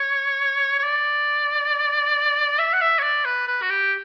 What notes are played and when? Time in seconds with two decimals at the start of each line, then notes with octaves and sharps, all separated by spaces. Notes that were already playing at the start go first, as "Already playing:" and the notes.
Already playing: C#5
0.79 C#5
0.83 D5
2.59 E5
2.73 F#5
2.81 E5
2.99 C#5
3.03 D5
3.25 B4
3.47 B4
3.62 F#4
3.70 G4